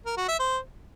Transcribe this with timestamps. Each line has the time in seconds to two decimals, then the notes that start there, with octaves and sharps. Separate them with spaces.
0.06 A#4
0.17 F#4
0.28 E5
0.39 C5